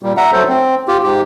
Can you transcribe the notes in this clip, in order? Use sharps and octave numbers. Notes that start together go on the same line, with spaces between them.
A#2 G3
E5 F#5 A#5
F#3 A3 A4 C5
C4
F4 G4
G#2 G4